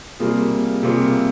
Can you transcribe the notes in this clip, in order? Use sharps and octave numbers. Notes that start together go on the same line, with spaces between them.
C3 G3 A#3 F4 G#4
C3 G3 A#3 F4 G#4